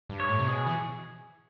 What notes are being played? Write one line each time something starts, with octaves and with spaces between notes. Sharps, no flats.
G2
C#5
A2
C3
B2 G#4
E3